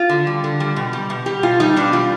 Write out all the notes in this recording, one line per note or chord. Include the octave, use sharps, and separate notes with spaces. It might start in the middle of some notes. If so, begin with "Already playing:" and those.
Already playing: F4
D3
G3
D3
G3
B2
G3
B2
G3 G4
B2 F4
G3 D#4
B2 D4
G3 F4